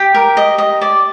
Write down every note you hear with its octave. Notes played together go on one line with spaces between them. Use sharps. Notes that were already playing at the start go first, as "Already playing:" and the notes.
Already playing: G4 G5
A#4
D#5
D#5
D5